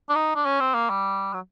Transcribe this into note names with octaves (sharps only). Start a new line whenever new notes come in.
D4
D#4
D4
C#4
C4
A#3
G3
F#3